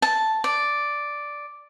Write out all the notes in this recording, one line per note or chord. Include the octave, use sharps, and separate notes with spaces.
A5
D5